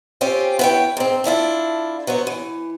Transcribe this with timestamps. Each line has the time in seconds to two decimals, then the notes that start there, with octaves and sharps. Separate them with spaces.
0.21 C4 C#4 F4 G4
0.59 B3 E4 B4 C#5 G5
0.97 G#2 C4
1.24 A3 D4 E4 F4
2.07 F#3 B3 C5 C#5
2.27 E3